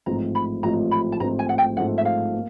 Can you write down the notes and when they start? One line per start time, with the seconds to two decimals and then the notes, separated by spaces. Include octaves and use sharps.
0.06 A1 G#2 F3 A3 C4 A#5
0.35 B5
0.63 A1 G#2 F3 A3 C4 A#5
0.91 B5
1.12 A5
1.20 A1 G#2 F3 A3 C4 A#5
1.39 G#5
1.49 F#5
1.58 G5
1.77 A1 G#2 F3 A3 C4 F#5
1.98 E5
2.05 F5
2.34 A#3